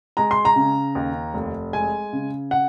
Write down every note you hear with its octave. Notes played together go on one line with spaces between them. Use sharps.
G#3 A#5
C6
A#5
C#3
D#2
F1
G#3 G#5
C#3
F#5